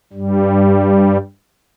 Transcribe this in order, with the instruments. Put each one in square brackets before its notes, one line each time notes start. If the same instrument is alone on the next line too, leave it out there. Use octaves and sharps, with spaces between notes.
[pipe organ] G2 G3